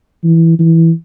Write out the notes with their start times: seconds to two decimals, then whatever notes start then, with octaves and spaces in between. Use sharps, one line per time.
0.24 E3
0.59 E3